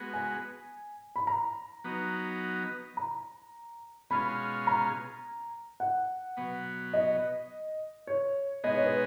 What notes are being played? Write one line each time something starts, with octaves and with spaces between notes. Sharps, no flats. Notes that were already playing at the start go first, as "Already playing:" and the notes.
Already playing: G#3 B3 F#4
G#5
B5
A#5
F#3 B3 D#4
A#5
B2 G#3 C#4 F4 B5
A#5
F#5
B2 F#3 B3
D#5
C#5
B2 G#3 B3 D#4 G#4 D#5
C#5
B4